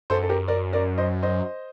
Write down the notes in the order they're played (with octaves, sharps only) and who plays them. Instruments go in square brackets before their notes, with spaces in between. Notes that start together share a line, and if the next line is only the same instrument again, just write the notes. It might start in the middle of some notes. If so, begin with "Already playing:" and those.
[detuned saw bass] F#2 [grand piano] A4 C5
[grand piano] A4
G4 A#4
A#4 D5
A#4 D5
C5 D#5
C5 D#5